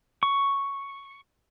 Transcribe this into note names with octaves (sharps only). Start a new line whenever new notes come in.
C#6